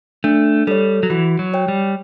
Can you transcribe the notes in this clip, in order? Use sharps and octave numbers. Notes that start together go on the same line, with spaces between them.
A3 D4
G3 A4 C#5
F#3
E3 F#4
F#3
C#5 G5
G3